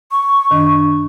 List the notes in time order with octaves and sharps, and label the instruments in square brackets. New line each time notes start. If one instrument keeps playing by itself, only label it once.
[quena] C#6
[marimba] F#2 D#3 D4